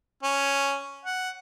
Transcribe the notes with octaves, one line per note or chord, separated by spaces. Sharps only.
C#4
F#5